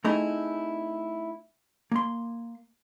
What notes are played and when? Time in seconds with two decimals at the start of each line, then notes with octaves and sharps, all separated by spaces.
0.04 A3 C4 D#4 E4 G#4
1.92 A#3 C6